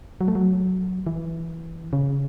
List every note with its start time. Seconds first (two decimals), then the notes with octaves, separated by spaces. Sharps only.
0.21 F#3
0.28 A3
0.35 F#3
1.06 E3
1.93 C#3